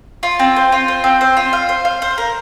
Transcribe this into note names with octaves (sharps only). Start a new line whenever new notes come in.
F4
C4
C5
F4
C5
C4
C5
F4
F5
C5
F5
C5
A#4